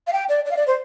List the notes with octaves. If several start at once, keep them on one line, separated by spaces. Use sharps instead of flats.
F5
G5
D5
D5
F5
D5
C5